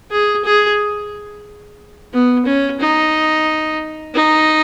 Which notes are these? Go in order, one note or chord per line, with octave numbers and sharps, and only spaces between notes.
G#4
G#4
B3
C#4
D#4
D#4